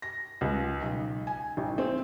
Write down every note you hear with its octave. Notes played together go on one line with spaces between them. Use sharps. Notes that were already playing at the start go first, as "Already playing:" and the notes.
A#6
C#2
B1
G#5
A1
C4